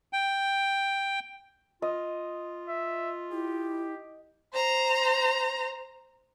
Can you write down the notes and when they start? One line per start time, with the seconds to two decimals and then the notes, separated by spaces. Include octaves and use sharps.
0.13 G5
1.82 F4 D#5
2.69 E5
3.32 E4 G4
4.54 C5 A#5